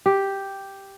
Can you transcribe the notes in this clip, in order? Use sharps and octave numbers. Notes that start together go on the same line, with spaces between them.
G4